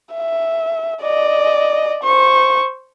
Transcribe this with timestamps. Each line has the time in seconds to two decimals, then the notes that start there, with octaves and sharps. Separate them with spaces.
0.14 E5
1.02 D5 D#5
2.04 C5 C#6